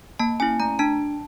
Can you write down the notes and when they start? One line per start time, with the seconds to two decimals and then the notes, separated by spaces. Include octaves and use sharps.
0.19 A#3 A5
0.40 C#4 E4 G#5
0.59 A3 A#5
0.79 D4 A5